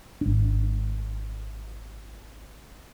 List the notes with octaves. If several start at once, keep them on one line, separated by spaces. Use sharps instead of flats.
G#1 D4